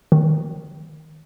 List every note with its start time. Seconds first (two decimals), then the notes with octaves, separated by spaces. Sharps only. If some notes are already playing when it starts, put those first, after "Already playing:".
0.12 D#3